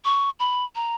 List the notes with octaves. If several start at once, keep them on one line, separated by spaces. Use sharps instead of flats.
C#6
B5
A#5